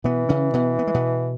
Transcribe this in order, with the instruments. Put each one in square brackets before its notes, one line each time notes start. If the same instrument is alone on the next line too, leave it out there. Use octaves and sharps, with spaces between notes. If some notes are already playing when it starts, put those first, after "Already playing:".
[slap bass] B2 B3 [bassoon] E3
[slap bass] C#3 C#4
B2 B3
B3
G#3
B2 B3